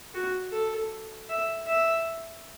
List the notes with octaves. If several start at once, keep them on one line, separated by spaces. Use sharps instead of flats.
F#4
A4
E5
E5